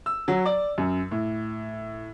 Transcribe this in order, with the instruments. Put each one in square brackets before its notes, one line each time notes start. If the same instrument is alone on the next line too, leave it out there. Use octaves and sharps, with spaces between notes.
[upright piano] E6
F#3
D5
F#2
A2